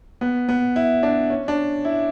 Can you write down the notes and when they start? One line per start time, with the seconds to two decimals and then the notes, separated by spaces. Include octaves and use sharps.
0.21 B3
0.49 B3
0.76 E4
1.03 D4
1.30 C#4
1.48 D4
1.85 E4